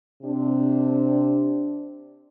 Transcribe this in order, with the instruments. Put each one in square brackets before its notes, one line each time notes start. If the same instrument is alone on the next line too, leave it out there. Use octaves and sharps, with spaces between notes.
[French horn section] C3 C4 D4